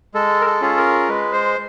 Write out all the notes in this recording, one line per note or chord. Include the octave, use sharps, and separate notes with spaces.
G#3 A4
A#4
A4
C#4 F4 G#4
A#4
G#3 B4
C5